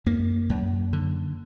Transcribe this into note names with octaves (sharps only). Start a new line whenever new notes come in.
F#2 A#3
F#2
D3